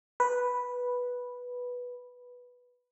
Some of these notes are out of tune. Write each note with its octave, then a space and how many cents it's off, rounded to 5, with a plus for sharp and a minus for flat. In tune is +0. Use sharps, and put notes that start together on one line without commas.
B4 -5